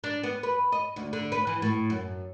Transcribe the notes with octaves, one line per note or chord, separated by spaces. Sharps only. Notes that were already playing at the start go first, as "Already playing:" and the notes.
D4
B3
B4
D#5
D2
D3
B4
E3
A2
F#2